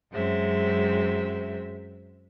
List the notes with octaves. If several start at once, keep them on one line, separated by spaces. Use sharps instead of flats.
F#2 F#3 G#3 C4 E5